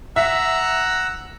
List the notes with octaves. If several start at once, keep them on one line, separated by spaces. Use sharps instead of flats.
E5 F#5 A#5 E6